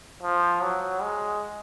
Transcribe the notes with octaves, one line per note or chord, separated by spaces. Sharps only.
F3
F#3
G#3